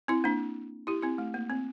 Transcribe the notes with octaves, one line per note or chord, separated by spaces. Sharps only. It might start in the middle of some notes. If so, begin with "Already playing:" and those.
C4 E4
A#3 D4
E4 G4
C4 E4
A3
A#3
C4